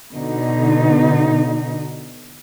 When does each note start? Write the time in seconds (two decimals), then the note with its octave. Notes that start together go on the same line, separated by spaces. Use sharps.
0.14 B2 D3 D#4